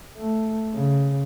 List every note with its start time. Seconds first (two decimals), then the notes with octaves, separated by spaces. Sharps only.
0.17 A3
0.75 C#3